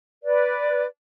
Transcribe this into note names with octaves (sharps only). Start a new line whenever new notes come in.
B4 D5